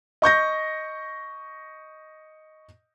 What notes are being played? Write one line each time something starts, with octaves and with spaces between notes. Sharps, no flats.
D#5 C#6 G6 A#6